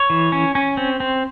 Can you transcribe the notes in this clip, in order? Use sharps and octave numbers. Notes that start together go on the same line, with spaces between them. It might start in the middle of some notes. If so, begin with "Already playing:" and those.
Already playing: C#5
E3
C#4
C#4
C4
C4